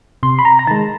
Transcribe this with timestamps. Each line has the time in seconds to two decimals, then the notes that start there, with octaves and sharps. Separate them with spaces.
0.23 C3 C6
0.39 B5
0.45 A#5
0.59 A#5
0.67 D#3 G#3 A5